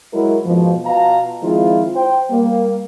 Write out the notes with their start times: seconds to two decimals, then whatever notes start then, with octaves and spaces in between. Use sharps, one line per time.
0.13 F#3 G#3 E4 A#4
0.45 F2 G#2 B2 F3
0.86 B2 F4 F5 A5 A#5
1.42 D#3 F3 G#3 C4 E4 F4
1.95 C5 G5
2.30 G3 A#3